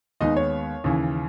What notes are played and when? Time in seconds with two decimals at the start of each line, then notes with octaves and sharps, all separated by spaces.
0.21 D#2 D#3 G#3 B3 D#4 D#5
0.37 C#5
0.84 D#2 C#3 E3